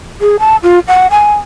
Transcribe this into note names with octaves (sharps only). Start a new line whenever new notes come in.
G#4
A5
F4
F#5
G#5